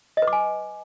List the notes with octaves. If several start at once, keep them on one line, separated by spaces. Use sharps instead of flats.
D#5
B4
D6
G#5